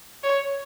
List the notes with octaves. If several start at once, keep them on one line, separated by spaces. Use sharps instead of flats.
C#5